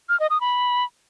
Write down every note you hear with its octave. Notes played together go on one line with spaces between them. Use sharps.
F6
D#5
D#6
B5